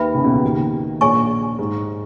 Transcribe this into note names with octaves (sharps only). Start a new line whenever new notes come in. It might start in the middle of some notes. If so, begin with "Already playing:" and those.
Already playing: D#2 D#3 B4 E5 B5
C#2 C#3
B1 B2
C#2 C#3
D#2 D#3
A#1 A#2 G#4 C#5 G#5 C#6
G#2